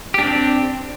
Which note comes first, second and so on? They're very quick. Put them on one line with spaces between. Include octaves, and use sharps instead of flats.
G4 D4 C4